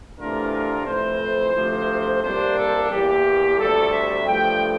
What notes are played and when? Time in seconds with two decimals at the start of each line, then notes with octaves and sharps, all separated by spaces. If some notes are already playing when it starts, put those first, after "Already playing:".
0.18 C3 E3 A3 D4 F4 A#4
0.53 A#4
0.86 F2 E3 A3 E4 C5
1.54 D2 C3 F3 A3
2.22 C2 C3 G3 A#3 D4 C5
2.56 A4
2.90 E2 E3 A#3 G4
3.58 D2 C3 G3 A4
3.92 E5
4.26 G2 F3 A3 G5